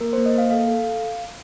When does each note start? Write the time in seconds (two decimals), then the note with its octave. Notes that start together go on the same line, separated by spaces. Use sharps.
0.01 A#3 A#4
0.13 C5
0.18 A#3
0.26 D#5
0.34 A#3 F5
0.51 A4 F5
0.68 A4